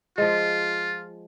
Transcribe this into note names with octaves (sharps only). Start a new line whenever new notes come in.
F3 G#3 F4